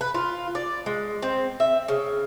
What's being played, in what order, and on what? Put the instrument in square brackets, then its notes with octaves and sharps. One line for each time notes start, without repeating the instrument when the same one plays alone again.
[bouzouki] B4
F4
D5
G#3
C4
E5
C#3